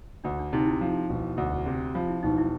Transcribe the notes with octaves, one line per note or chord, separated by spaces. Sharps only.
D2 D4
D4
C3 D#4
E4
F3
E1
D2
C3
F3 F4
E4
E1 D#4
E4